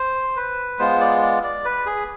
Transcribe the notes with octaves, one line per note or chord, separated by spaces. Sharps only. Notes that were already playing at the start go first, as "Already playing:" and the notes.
Already playing: C5
B4
G#3 B3 F4 C5
D5
D5
D5
B4
G#4